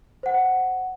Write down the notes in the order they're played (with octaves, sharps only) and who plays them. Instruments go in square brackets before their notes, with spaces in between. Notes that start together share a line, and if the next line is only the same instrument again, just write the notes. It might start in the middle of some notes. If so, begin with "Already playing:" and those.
[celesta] C5 F#5